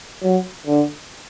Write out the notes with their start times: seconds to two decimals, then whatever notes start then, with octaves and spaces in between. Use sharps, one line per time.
0.23 F#3
0.67 D3